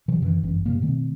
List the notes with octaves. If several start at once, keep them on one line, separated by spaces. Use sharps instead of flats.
C3 E3 F#3
F#2 D#3 E3
G1 F#2 E3
G2 C3 F3 A#3
B2 D#3 A3 C4